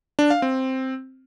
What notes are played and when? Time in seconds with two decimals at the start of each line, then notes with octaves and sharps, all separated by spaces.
0.19 D4
0.30 F5
0.42 C4